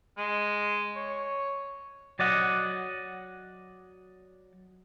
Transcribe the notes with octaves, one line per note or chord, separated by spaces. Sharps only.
G#3
C#5
F#3 D5 D#5 F#5